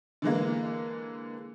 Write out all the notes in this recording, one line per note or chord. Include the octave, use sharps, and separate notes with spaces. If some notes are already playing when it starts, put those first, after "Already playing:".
D3 E3 G#3 A#3